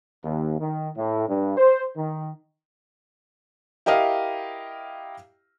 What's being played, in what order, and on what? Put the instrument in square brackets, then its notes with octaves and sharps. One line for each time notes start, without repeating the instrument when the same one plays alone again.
[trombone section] D#2
D#3
A2
G2
C5
D#3
[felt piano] E4 G4 A#4 D#5 F5